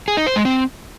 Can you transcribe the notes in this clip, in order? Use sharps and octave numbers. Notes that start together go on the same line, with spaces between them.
G#4
D#4
C5
G#3
C4